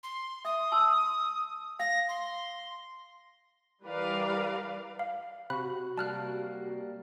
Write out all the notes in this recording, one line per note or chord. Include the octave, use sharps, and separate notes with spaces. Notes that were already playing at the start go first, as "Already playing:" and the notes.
C6
E5 D#6
A5 C6 E6
F5 A#6
C6
E3 G3 A#4 B4 D5 F5
F5
C3 F#4 B5 F#6
G3 A#3 A5 F6 F#6